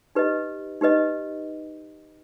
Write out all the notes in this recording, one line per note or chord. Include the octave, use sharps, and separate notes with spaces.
D#4 G4 B4 D#5
D#4 G4 B4 D#5